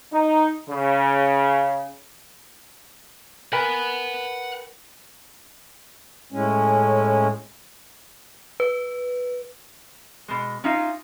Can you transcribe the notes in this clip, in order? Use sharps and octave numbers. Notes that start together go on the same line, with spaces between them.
D#4
C#3
A#4 B4 F#5 G#5 B5
A2 G#3 C#4
B4
B2 G#3
C#4 D#4 F4 E5